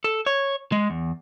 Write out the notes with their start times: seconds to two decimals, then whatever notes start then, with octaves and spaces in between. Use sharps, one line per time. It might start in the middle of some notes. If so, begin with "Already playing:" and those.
0.04 A4
0.26 C#5
0.72 G#3
0.90 E2